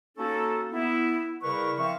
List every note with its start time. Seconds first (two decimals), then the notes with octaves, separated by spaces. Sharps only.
0.17 A#3 C#4 D#4 F#4 A4
0.72 B3 E4
1.43 C#3 G3 E4 A#4 B4 C#6
1.79 F3 C4 E5 F5 C#6